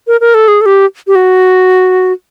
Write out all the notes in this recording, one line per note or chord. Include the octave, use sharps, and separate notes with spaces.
A#4
A#4
A4
G#4
A4
G4
G4
F#4